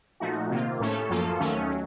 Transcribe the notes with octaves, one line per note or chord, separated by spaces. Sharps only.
A#2 F3 A3 D#4 F#4
C3 D#3 A#3 F4
A2 A3 C#4 A4 C#5
F#2 F3 A#3 F4 A4
D#2 D#3 F#3 A3 C#4
F#3